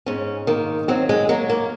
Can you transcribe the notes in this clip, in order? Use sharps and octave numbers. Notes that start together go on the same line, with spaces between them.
G#2 C#4
D#3 A#3
F#3 C4
G#3
F#3 A#3
A#3